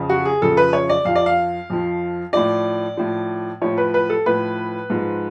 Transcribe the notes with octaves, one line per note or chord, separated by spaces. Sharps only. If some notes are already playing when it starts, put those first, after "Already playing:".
Already playing: F2 C#3 F3
F#4
G#4
F2 C#3 F3 A4
B4
C#5
D5
F2 F3 F5
D5
F5
F2 F3
A2 F3 D5
A2 F3
A2 F3 C#5
B4
B4
A4
A2 F3 B4
G#2 F3